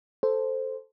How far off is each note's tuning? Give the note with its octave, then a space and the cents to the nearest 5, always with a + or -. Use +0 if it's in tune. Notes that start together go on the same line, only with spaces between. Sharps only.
A4 +0 C5 +0